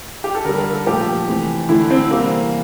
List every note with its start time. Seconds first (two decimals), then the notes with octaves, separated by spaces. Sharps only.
0.24 G4
0.35 A4
0.45 D3 G3 A#4
0.58 A#4
0.73 A4
0.86 A#2 F3 A3 G4
1.28 C3 E3 A3
1.69 D3 A3 E4
1.91 C4
2.11 C3 E3 G3 A#3